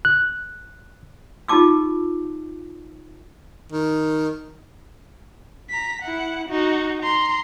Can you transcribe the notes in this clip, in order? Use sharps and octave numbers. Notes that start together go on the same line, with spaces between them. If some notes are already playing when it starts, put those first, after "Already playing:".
F#6
D#4 F4 G4 A5 D6 E6
D#3
A#5 B6
E4 F#5
D#4 F#4
A#5 C6